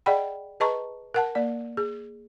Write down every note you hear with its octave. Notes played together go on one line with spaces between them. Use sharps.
G#4 D5 D#5 F#5 G5 B5
G#4 B4 D#5 A5 A#5 C#6
A#4 F#5 A5
A#3 D5
G#4